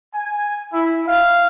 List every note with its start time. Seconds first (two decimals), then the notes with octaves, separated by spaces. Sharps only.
0.13 G#5
0.72 E4
1.07 F5